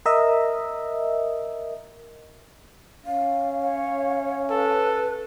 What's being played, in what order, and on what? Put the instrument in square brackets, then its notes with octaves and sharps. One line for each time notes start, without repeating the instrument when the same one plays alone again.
[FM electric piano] A#4 D#5 E5
[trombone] C#4 [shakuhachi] F5
[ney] C#5
[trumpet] A4 [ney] B4